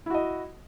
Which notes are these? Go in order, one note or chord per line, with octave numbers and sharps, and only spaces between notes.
E4 F#4 D#5